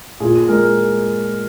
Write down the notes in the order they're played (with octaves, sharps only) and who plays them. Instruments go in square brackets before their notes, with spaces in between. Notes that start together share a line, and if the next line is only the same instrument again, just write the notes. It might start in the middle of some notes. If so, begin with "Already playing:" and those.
[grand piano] A#2 G#4
G#3 A#4